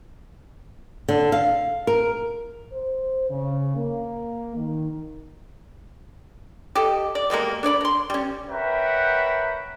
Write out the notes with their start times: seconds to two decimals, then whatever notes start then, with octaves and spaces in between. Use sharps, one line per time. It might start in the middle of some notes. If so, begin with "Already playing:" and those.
1.08 D3
1.32 F5
1.87 A#4
2.72 C5
3.29 C#3
3.75 A#3
4.56 D#3
6.75 G4 A4 D#5
7.15 D5
7.30 B2 G3 G#3 A#3
7.63 D4 C#5 D5 B5
7.81 A#5 C6
8.10 G3 C#4
8.49 A#4 B4 C#5 E5 F#5 G5